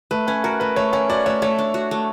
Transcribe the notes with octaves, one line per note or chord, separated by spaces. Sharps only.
A3 B4
C#4 B4
F#4 A#4
A3 B4
A3 C#5
C#4 C#5
F#4 D5
A3 C#5
A3 C#5
D4
F#4
A3